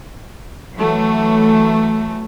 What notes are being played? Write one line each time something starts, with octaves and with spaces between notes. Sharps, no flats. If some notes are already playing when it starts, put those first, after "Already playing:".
E3 F#3 A3